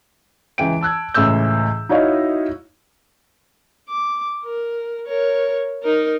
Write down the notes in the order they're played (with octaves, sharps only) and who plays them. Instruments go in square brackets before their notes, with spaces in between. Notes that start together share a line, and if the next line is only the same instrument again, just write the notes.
[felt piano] C#2 E3 G5 D7
A5 E6 F#6 G#6
C#2 A2 E3 E6 G6
D#4 E4 F#4 C#5 D#5 F5
[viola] D6
A#4
A#4 C#5
D#4 A#4